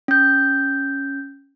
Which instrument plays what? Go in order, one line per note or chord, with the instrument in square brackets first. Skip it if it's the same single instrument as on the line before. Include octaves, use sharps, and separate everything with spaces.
[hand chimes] C#4 G6